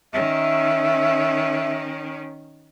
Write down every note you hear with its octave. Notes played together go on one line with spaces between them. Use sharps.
D#3 C#4 E5